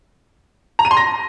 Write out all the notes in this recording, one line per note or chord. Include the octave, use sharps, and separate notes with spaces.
A#5
D#7
C6
A#6